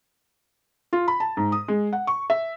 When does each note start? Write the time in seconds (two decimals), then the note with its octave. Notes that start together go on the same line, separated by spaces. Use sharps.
0.93 F4
1.08 B5
1.20 A5
1.37 G#2
1.52 D#6
1.68 G#3
1.93 F#5
2.07 C#6
2.30 E5